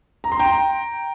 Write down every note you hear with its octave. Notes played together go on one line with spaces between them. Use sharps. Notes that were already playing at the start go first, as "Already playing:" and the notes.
A#5
C6
G5 A#5